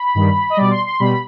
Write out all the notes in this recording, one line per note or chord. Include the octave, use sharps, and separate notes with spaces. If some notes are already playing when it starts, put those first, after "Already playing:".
Already playing: B5
G2 D#3 G3
D#5
B2 G3 D5
C6
C6
B2 G3 B5